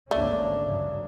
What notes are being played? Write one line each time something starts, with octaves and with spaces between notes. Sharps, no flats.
G#1 D2 A3 A#3 C#4 D4 D5
G2 C#3 F#3